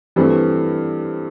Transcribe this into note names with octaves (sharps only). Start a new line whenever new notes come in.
G2 E3 A3 C4